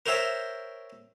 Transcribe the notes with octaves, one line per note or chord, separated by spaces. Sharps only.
A#4 C5 C#5 E5 G5